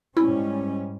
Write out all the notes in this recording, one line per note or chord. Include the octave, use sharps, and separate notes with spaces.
G#2 G3 C#4 E4